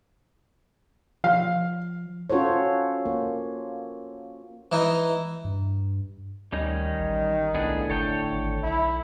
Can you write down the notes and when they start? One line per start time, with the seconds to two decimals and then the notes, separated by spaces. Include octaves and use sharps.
1.24 F3 F5
2.30 C#4 F4 F#4 A4 C5 C#5
3.06 A#3
4.72 E3 D#4
5.45 G2
6.52 D2 D#3 G3 C#4 D#4
6.99 A1
7.55 C2 A2 D3 B3 D4 G#4
7.90 G1 A4 C#5 G5
8.32 G#1
8.63 B1 E4